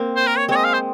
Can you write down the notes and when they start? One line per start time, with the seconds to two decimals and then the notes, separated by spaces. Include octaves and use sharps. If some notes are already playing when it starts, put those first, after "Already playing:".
Already playing: A#3 C4
0.16 C5
0.27 A#4
0.38 C#5
0.48 G#3 C4 C#5
0.56 D#5
0.64 F5
0.73 C5